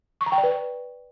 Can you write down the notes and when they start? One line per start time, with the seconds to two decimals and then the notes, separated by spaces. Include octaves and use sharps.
0.21 C#6
0.26 A#5
0.32 G5
0.38 D5
0.43 B4